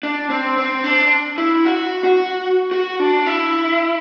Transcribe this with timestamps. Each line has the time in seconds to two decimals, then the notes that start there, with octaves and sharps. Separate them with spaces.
0.03 D4
0.30 C4
0.58 C4
0.84 D4
1.38 E4
1.65 F#4
2.04 F#4
2.71 F#4
3.00 D4
3.26 E4